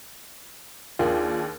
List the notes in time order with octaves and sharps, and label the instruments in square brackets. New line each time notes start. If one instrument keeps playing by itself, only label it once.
[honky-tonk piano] D#2 [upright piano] D4 G#4 G5 [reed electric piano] F4 [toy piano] A#4 D#6